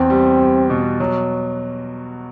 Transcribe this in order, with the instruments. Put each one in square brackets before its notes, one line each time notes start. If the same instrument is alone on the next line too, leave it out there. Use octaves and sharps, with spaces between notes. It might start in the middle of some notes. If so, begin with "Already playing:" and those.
Already playing: [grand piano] E2 [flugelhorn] C4
[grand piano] G3
G3
B2
F#3